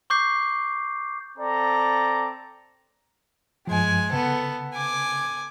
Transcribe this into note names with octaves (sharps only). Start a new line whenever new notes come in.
C#6 D6 G6 C7
C4 A4 D5 A#5
G2 F3 G#3 G#5
C#3 B3 A4
G#5 D6